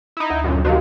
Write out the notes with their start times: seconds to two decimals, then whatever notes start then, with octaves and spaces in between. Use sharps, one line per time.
0.17 D#4 E4
0.30 D2
0.44 F#2 A#2 D3
0.65 C2 C3 D#3 F#4 D#5 F5